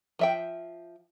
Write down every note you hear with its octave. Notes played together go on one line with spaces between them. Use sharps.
F3 E5 G5